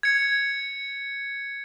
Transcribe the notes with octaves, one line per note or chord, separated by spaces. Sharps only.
G#6 C#7